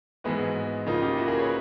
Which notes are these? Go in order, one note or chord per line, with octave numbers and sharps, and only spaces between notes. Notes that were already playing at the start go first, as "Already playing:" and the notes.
G#2 E3 G#3 B3 E4 F#4
C#3 F3 A#3 D#4 F4
F4 G4
E4 F#4
G#4 A#4
B4 C#5